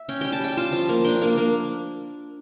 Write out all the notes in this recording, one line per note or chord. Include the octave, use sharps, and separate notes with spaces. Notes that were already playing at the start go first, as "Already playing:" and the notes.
Already playing: E5
C#4 G5
G3 G5
A5
G3 G5
F4 A5
F3
A#3
D4 G5
A#3
A#3